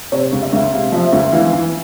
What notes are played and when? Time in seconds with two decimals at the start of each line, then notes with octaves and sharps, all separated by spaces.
0.12 C3 C#5
0.32 C#2
0.42 E5
0.53 C#2
0.72 C3 F5
0.92 F3 E5
1.13 C#2 E5
1.32 E3 F5
1.53 E3